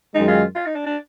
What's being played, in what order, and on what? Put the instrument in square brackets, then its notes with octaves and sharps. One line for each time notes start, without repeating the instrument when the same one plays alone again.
[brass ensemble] F#2 D#3 G#3 [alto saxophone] D#4
[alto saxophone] F4
F4
D#4
D4
D4